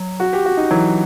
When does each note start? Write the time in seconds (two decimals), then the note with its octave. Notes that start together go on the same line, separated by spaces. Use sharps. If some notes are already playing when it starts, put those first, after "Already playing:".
Already playing: F#3
0.20 F#4
0.33 G4
0.45 F#4
0.57 D#4
0.71 E3 F#3